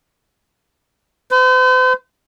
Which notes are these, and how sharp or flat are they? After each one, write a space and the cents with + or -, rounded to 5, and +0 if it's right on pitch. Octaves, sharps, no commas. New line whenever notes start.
C5 -45